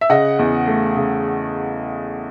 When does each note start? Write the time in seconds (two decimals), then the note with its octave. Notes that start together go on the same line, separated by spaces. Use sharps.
0.01 E5
0.10 C#3 D#5 F#5
0.39 E2
0.67 A3
0.96 C#3